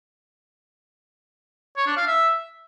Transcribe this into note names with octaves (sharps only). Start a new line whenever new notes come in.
C#5
D4
F5
E5